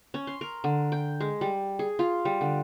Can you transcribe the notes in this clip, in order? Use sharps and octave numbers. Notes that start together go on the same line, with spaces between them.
C#4
C6
A#4
D3
G5
G#3
G3
G#4
F4
G3
D3